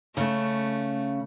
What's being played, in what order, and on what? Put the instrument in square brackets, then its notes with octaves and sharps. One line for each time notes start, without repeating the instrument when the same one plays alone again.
[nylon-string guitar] C#3 [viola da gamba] A3